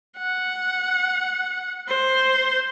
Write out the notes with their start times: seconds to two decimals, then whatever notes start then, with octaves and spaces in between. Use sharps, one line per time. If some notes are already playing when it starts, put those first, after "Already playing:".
0.19 F#5
1.88 C5